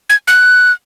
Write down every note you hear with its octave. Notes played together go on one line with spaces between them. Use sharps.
G#6
F#6